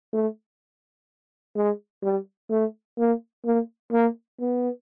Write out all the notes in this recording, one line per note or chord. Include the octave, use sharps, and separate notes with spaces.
A3
G#3
G3
A3
A#3
A#3
A#3
B3